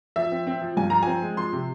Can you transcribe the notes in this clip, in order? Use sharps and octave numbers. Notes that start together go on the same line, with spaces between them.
F3 E5
C4
C4
F3
G2 G#5
F3 A#5
C4 G#5
G#3
F3 C6
C3